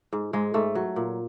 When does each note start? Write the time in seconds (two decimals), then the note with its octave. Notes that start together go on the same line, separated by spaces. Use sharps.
0.13 G#2
0.33 G#2 G#3
0.54 G#2 A3
0.75 F#3
0.96 A#2